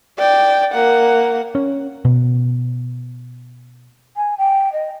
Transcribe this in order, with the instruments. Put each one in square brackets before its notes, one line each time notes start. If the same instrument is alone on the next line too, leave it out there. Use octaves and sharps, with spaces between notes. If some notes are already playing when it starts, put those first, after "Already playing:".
[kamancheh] D5 G5
A#3 F#5
[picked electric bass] C#4
B2
[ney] G#5
G5
D#5